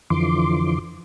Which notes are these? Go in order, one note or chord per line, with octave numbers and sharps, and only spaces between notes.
F2 D3 E3 F3 C6 D6